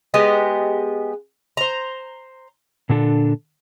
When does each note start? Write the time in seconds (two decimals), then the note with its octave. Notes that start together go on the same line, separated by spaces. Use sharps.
0.14 G#3 B3 G4 D#5
1.57 C5 A#5
2.89 A#2 D3 D4 A4